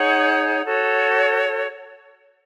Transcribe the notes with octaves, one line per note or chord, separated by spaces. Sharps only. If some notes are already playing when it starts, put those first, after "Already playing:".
Already playing: D#4 G#4 C#5 F#5
F#4 A4 C#5